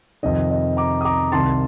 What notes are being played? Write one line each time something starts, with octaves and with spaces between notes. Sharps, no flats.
F2 C3 D#3 D#5
D#5
A#5 D6
D#6
A#5 D6
C2 C3 D#3 A5 C6